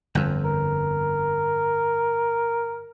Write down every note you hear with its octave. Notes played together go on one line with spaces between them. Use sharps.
G1 F2
A#4